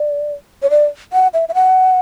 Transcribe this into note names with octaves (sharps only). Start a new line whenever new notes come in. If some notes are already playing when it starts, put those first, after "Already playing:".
Already playing: D5
C#5
D5
F#5
E5
E5
F#5